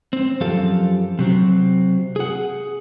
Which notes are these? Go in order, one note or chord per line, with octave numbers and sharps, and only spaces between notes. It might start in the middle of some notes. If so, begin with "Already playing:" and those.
C4
F#2 F3 G4 A4 F5
C3 F#3 C4
G#4 F#5